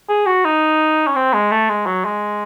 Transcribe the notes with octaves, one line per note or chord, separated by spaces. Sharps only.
G#4
F#4
D#4
C#4
C4
G#3
A3
G#3
F#3
G#3